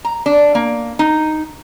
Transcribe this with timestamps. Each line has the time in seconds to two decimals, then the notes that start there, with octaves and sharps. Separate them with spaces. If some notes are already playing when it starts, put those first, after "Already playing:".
0.05 A#5
0.26 D4
0.55 A#3
0.99 D#4